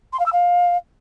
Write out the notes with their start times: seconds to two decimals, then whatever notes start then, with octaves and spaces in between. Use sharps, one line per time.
0.13 C6
0.19 F5
0.26 E6
0.32 F5